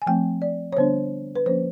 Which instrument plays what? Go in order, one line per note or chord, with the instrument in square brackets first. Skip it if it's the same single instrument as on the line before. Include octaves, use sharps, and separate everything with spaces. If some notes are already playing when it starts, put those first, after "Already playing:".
[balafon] G#5
F3 A3 C4 G5
D5
C#5
D3 G3 B3 D4 C5
B4
F3 A#3 C#4 C5